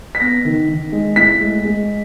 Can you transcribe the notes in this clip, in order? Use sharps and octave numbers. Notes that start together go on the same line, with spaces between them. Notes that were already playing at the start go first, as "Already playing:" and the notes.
B6
B3 A#6
D#3
D#3
G#3
A2 B6
G#3
G#3